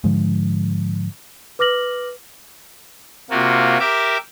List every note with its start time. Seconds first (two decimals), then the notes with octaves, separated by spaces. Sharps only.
0.04 G#2 D3 F3 G#3
1.59 B4 D6 F6 A#6 F#7
3.30 C3 A#3 F4 F#4
3.80 G4 A#4 E5 D6